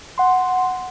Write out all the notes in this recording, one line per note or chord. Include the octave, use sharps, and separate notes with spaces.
F#5 C6